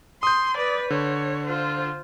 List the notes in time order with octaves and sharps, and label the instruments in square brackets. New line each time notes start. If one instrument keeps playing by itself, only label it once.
[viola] C6 [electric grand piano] D#6 G6
[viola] B4 D5
[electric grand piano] D3 [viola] C#5
[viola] F4 C5